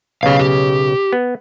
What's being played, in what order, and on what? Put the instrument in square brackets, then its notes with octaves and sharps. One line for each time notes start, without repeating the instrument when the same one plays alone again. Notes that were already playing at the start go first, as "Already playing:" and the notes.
[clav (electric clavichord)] B1 C#3 [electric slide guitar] G4 F5
[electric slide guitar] G4
[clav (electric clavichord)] B3